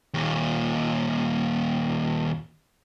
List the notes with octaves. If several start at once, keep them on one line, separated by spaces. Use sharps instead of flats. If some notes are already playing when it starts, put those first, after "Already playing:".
D#2 A#2